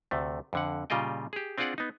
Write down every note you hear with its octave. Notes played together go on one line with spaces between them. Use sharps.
D2 C3 A3
F2 D3 F#5
A#2 C#3 G3 F4 D#5 G5
G4 G#4
C4 D4 F4 G#4 D5 F#5
B3 D#4